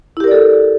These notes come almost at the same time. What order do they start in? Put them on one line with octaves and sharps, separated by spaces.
E4 G4 A#4 D5 A4